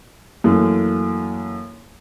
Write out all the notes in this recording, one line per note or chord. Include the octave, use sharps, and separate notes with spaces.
F#2 E3 A3 A#3